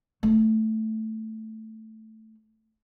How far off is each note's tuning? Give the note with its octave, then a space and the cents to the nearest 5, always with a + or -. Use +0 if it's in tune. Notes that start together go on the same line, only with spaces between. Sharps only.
A3 +0 C4 -45